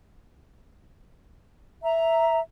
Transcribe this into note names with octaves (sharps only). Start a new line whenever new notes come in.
E5 A#5